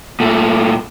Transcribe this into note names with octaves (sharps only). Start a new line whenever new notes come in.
A#2 A3